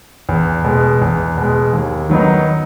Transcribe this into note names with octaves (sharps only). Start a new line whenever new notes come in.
E2
B2 G#3
E2
B2 G#3
D#2
D#3 F#3 B3 D#4